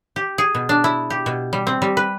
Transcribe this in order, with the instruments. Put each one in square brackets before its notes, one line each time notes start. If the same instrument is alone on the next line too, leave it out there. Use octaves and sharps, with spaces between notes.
[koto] G4
G#4
B2
D4
E4
G4
B2
G3
C4
G3
B4